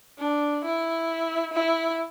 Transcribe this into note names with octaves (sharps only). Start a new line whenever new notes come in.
D4
E4
E4